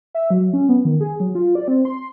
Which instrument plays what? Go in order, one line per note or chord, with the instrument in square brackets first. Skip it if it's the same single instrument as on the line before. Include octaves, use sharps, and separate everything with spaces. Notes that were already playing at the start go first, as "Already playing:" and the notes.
[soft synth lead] E5
F#3
C#4
B3
D#3
G#4
F#3
F4
D5
C4
C6